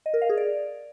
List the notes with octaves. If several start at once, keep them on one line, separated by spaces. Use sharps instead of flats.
D#5
A#4
F5
G#4
D5